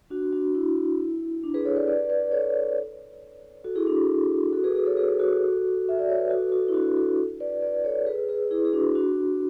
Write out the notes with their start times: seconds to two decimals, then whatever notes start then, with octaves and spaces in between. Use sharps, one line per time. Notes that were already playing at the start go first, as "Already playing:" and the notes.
0.10 D4 F#4
0.33 D4 F#4
0.55 E4
1.43 D4
1.54 G#4 B4
1.65 A4 C#5
1.76 B4 D5
1.87 B4 D5
2.10 B4 D5
2.31 A4 C#5
3.64 F#4 A4
3.76 E4 G#4
3.87 D4 F#4
4.53 F#4 A4
4.64 G#4 B4
4.75 G#4 B4
4.86 A4 C#5
4.97 G#4 B4
5.19 F#4 A4
5.89 E5
5.99 D5
6.09 C#5
6.20 B4
6.30 F#4 A4
6.52 F#4 A4
6.68 E4
6.74 D4 F#4
6.96 F#4 A4
7.40 B4 D5
7.62 B4 D5
7.84 A4 C#5
8.07 G#4 B4
8.29 G#4 B4
8.51 E4 G#4
8.65 G#4
8.73 D4 F#4
8.95 D4 F#4